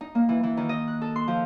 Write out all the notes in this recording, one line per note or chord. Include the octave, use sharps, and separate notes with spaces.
D#4
A#3
E3
E3
D#3
D#5
F#6
A4
C6
F3